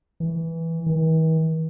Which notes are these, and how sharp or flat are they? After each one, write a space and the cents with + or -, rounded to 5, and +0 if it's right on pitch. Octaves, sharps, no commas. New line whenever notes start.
E3 -5
E3 -45